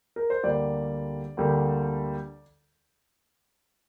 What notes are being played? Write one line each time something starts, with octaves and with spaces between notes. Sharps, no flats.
A#4
C5
D2 D3 G3 A#3 D5
D2 D3 G3 A#3